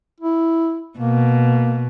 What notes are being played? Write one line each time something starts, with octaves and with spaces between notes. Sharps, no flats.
E4
B2 A#3